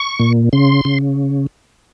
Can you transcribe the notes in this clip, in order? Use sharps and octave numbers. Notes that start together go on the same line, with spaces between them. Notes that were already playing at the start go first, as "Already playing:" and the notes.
Already playing: C#6
A#2
C#3 C6
C#3